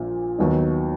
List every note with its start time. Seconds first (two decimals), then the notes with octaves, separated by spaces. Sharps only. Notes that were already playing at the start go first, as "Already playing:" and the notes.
Already playing: A#1 A#2 F3
0.38 D#2 D#3 F#3 B3 D#4